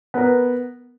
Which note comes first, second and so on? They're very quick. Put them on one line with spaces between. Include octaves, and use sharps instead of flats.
B3 A#4 B4